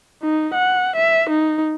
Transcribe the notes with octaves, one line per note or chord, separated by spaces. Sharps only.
D#4
F#5
E5
D#4